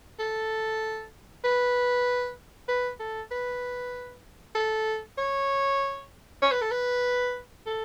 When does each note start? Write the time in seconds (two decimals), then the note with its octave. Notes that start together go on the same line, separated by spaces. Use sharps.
0.19 A4
1.44 B4
2.69 B4
3.00 A4
3.31 B4
4.55 A4
5.18 C#5
6.42 C#5
6.52 B4
6.62 A4
6.71 B4
7.67 A4